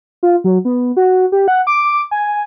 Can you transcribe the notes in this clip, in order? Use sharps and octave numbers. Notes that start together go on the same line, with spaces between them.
F4
F#3
B3
F#4
G4
F#5
D6
G#5